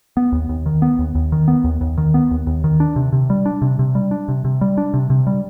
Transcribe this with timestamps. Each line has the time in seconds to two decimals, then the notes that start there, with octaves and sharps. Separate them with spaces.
0.17 B3
0.32 D#2
0.49 D#2
0.66 D#3
0.82 B3
0.99 D#2
1.15 D#2
1.32 D#3
1.48 B3
1.64 D#2
1.81 D#2
1.97 D#3
2.14 B3
2.31 D#2
2.47 D#2
2.64 D#3
2.80 D4
2.96 C3
3.13 C3
3.30 G3
3.46 D4
3.62 C3
3.79 C3
3.95 G3
4.11 D4
4.28 C3
4.45 C3
4.61 G3
4.78 D4
4.94 C3
5.10 C3
5.27 G3